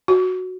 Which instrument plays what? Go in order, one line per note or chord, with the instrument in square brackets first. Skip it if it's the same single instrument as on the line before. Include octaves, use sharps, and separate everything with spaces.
[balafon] F#4